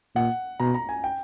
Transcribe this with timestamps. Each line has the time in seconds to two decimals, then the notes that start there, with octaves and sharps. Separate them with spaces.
0.15 A#2 F#5
0.60 B2 A#5
0.74 A#5
0.89 G#5
1.04 G5